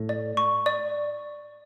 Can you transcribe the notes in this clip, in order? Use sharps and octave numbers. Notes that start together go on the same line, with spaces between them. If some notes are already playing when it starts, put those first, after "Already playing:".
Already playing: A2
D5
C#6
D5